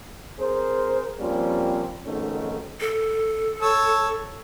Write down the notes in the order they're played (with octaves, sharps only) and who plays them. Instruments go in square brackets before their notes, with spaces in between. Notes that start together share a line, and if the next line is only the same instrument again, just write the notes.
[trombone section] C4 G#4 A#4 C5
F3 G3 A#3 C4 C#4 F4
F2 G#2 B2 D#3 A3 C#4
[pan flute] A4
[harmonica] C#5 A5 E6